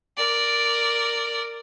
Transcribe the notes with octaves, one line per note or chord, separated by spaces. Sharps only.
A#4 D5